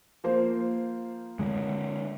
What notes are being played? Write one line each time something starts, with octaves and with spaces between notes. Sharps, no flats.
F3 A#3 C5
D3 G#3